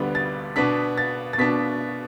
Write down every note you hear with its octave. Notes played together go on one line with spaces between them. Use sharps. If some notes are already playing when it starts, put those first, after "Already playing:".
Already playing: D2 D3 G3 B3 D4
A6
B2 B3 D4 B6
A6
A6
B2 B3 D4 B6